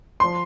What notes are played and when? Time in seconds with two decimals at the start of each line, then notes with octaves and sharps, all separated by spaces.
0.20 F3 C6